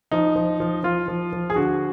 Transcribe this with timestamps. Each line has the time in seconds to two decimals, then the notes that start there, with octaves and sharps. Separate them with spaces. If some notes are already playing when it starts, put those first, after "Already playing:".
0.11 F3 D#4
0.36 F3
0.60 F3
0.84 F3 F4
1.08 F3
1.33 F3
1.50 G#4
1.56 D3 F#4